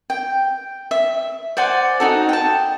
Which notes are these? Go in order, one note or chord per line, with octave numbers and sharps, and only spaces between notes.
G5
E5
C5 D5 F#5 G#5
D#4 F#4 A4
G5 A5